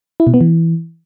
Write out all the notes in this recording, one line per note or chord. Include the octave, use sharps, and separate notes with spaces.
E4
B2
B3
E3